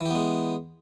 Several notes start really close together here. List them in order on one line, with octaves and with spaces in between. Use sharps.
E3 G4 B3 G#3